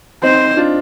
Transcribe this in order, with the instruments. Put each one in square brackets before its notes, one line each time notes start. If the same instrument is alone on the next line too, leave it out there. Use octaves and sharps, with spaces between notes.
[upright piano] C4 D#4 [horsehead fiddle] C5
[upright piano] D4 F4